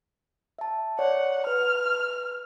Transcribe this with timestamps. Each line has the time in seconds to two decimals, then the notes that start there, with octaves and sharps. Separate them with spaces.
0.59 E5 A5
0.99 C#5 D5 F#5
1.47 B4 F6